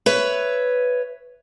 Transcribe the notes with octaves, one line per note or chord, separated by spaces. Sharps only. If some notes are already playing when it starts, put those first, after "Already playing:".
B4 C#5 E5